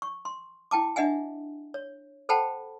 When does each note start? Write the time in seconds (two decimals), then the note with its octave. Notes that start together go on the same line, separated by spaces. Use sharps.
0.02 C#6
0.25 C6
0.71 E4 G5 A5 D6
0.96 D4 D#5 E5 F#5 G#5
1.74 C#5
2.29 A4 C5 F#5 G5 A5 B5